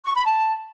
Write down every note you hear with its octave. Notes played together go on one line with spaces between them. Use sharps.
C#6
B5
A5